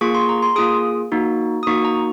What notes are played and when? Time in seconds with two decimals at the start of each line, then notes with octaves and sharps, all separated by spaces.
0.01 A#3 F4 G#4 C#6
0.14 C6
0.29 A#5
0.42 C6
0.56 A#3 F4 G#4 D#6
1.12 A#3 D#4 F#4
1.63 D#6
1.67 A#3 D#4 F#4 C#6
1.85 A#5